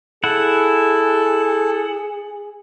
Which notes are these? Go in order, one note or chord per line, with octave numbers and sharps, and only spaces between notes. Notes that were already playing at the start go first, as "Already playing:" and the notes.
E4 G#4 A4 F#5